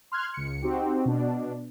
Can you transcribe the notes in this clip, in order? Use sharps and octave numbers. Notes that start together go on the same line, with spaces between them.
C6 F6 F#6 G#6
C#2 C#7
C4 D#4 F#4 G4
B2 D4